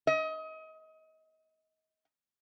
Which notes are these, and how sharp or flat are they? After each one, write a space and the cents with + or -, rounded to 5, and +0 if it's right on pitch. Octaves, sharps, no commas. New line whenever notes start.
D#5 +30